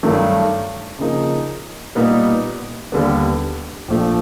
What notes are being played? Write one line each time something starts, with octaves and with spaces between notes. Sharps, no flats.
G2 D#3 F#3 A3
C#3 F3 A#3 D#4
A#2 G3 B3 D#4
D#2 D3 G3 B3
A#1 A#2 F3 A3